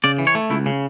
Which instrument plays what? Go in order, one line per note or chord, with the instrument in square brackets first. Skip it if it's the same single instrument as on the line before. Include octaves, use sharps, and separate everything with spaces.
[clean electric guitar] C#3 D5
E3
C#5
A3
C#2 E4
C#3